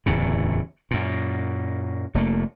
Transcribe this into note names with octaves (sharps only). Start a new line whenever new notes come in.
D1 E2 A2 C#3
F#2 A#2
F1 A3 A#3